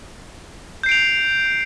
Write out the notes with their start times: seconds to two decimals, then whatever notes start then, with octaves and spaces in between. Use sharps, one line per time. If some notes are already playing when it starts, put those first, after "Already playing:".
0.83 G6
0.86 C7
0.89 D7
0.92 F7